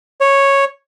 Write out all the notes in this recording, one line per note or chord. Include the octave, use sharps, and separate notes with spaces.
C#5